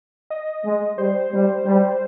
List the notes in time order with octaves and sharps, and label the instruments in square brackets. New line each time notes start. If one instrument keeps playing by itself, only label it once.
[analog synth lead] D#5
[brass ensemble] G#3
[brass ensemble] G3 [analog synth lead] C5
[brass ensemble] G3
G3